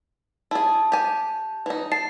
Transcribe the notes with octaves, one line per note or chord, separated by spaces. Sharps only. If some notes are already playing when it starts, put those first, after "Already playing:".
E4 G#4 A5
G4 G#5
E3 D#4
A5 C7